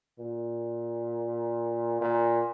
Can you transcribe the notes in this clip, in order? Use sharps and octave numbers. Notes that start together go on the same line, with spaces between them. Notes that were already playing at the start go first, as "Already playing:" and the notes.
A#2
A#2